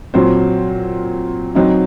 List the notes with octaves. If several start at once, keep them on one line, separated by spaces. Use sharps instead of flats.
A#2 F#3 C4 C5
F#3 C4 D#4